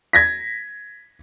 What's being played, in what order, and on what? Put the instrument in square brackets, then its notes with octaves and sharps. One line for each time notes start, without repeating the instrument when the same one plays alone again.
[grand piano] G#6 A#6 B6